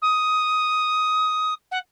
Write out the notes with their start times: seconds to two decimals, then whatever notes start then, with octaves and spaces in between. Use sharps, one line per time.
0.02 D#6
1.71 F#5